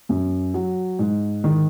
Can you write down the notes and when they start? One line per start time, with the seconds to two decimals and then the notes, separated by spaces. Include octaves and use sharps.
0.09 F#2
0.54 F#3
0.99 G#2
1.44 D#3